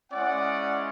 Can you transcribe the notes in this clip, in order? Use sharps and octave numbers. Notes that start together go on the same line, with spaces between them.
G#3 C#4 E4 D5 F#5